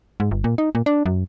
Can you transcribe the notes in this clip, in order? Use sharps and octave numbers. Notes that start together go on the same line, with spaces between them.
G#2
G1
A#2
D#4
A#2
D4
F#2